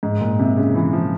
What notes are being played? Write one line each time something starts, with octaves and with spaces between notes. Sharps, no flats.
G#2
A#2
C3
C#3
E3
F3